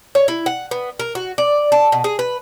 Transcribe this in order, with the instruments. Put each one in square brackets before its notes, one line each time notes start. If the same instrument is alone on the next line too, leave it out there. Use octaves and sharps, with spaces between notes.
[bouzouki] C#5
E4
F#5
B3
A#4
F#4
D5
A4
B2
G#4
B4